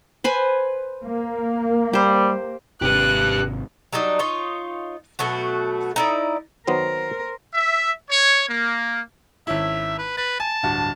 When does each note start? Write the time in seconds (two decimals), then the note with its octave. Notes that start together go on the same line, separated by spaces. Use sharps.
0.24 B4 C5 G#5
1.03 A#3
1.93 G3 G4 C5
2.82 G#1 C3 G4 B4 F#6
3.93 F#3 G3 D4 D#4
4.19 D#4 F4 C#5
5.19 B2 F#3 A3 F#4
5.96 D#4 E4 D5
6.67 D#3 F#3 B3 A#4 C5
7.54 E5
8.10 C#5
8.48 A#3
9.47 G#1 C#4 E4 E5
9.98 B4
10.17 B4 A6
10.40 G#5 A5
10.63 D1 G2 F#4